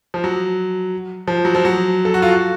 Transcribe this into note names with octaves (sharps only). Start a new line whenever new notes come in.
F3
F#3
F3
F#3
F3
F#3
A4
F#4
F4
F#4